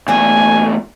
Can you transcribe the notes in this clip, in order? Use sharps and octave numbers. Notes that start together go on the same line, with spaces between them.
E2 A#2 A3 C4 D4 G#5